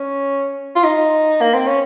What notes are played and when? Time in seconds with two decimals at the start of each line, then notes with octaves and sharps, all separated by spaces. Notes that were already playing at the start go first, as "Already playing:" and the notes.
Already playing: C#4
0.75 F4
0.84 D#4
1.41 A#3
1.54 C4
1.67 C#4